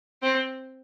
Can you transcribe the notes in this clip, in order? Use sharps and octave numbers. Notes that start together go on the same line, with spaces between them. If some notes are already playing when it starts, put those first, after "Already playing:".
C4